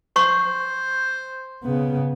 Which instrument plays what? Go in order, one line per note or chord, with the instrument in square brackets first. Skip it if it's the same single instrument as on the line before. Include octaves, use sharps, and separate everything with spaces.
[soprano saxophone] C5 [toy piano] C#6
[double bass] C#3 B3